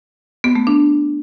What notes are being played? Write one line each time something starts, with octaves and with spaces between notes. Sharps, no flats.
B3
A3
D4